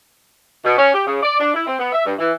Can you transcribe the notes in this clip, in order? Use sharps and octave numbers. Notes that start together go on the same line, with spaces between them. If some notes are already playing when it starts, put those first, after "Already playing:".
B2
C#4
G4
C#3
D5
D4
E4
C4
B3
E5
G2
E3